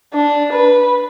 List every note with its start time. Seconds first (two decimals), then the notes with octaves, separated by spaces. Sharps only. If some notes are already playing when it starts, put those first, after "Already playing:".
0.13 D4
0.53 B4